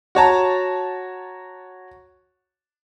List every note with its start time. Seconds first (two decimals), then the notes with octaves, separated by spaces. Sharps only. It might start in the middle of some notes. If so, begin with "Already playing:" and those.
0.15 F#4 C#5 A5 A#5